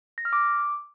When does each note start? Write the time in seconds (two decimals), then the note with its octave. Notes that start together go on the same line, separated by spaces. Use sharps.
0.18 A#6
0.25 F6
0.33 D6